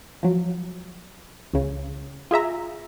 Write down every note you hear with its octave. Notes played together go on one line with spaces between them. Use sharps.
F3 F#3
C#2 C#3
F4 G#4 E5 A#5